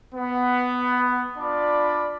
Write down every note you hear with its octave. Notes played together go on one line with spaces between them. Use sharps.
B3
D4 F4 D5 B5